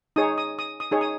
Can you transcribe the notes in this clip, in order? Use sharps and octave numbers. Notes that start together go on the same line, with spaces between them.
D#4 G#4 C#5 D#6
D#6
D#6
D#6
D#4 G#4 C#5
D#6